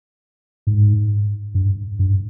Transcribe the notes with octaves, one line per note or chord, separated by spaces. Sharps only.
G#2
G2
G2